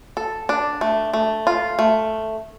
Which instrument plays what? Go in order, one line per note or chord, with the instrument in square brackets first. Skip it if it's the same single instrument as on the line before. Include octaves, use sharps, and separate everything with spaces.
[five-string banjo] A4
D4
A3
A3
F4
A3